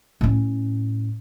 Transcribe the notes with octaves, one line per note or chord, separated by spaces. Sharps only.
A2 C#4